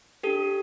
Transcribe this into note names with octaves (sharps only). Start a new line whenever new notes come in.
D4 G4 A4